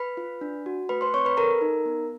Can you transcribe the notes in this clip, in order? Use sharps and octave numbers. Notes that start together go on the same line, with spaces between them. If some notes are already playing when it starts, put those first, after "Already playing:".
Already playing: B4 B5
F4
D4
F#4
A3 B4 B5
C5 C6
C4 C#5 C#6
B4 B5
A4 A#4 A#5
D#4
B3